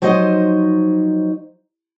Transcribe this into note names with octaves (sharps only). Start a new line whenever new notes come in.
F3 F#3 D#4 C5 D#5